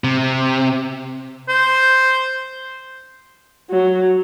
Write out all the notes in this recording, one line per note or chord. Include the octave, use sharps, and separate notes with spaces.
C3
C5
F#3